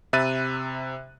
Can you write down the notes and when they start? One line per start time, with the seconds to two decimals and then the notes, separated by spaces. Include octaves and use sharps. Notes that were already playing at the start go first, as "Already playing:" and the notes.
0.13 C3 E5 B5 F#6 A6 D#7